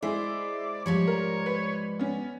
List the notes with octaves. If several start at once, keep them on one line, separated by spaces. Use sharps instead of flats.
G#3 E4 G#4 C5 D5
G#2 F3 G3 C#5
A#4
B4
B3 C#4